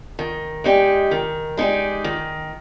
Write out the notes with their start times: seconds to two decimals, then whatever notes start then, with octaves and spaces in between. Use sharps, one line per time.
0.19 D#3
0.64 G#3 D#4 G4 D5
1.11 D#3
1.57 G#3 D#4 G4 D5
2.04 D#3